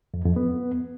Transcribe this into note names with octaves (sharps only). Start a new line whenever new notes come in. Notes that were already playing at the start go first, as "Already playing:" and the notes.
F2
F2
B3